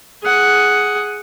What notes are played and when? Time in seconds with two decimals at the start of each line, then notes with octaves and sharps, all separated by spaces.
0.23 G#4 F#5